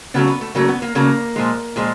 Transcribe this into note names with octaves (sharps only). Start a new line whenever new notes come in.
C#3 F#3 A3 B3
B3
A3
C#3 F#3 A3 A#3
B3
A#3
C#3 F#3 A3 A#3
A#2 F3 G#3
A#2 F3 G#3